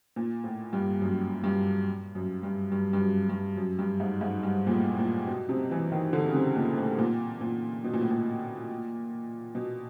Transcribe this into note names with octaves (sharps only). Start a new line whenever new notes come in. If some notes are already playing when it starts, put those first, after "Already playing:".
A#2
A2
G2
F#2
G2
F#2
G2
G2
G2
F#2
G2
F#2
G2
G#2
G#2
G2
A#2
A2
A2
A#2
B2
C3
E3
D#3
D3
C#3
C3
A#2
A2
A#2
A#2
B2
A#2
A2
A#2
B2